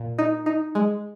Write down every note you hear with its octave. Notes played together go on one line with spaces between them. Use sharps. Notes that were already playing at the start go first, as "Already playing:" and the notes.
Already playing: A#2
D#4
D#4
G#3